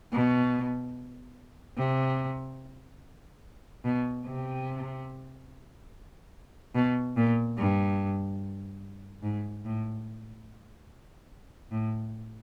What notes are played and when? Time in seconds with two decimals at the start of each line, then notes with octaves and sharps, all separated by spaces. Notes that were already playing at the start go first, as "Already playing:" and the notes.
0.12 B2
1.77 C3
3.85 B2
4.26 C3
6.75 B2
7.17 A#2
7.58 G2
9.23 G#2
9.65 A2
11.71 A2